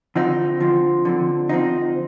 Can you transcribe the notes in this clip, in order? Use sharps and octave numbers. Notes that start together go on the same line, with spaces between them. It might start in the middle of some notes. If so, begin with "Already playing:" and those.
D3 F3 C4 D#4
D3 F3 C4
D3 F3 C4
D3 F3 C4 D#4